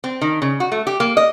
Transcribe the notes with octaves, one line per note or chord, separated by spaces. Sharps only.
C4
D#3
C#3
F#4
A3
G4
A#3
D#5